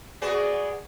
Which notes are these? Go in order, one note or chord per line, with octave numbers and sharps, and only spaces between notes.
B3 F#4 G#4 D5